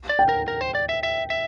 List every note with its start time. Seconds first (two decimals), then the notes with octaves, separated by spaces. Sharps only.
0.09 D5
0.19 G5
0.29 A#4
0.48 A#4
0.61 C5
0.75 D5
0.89 E5
1.03 E5
1.30 E5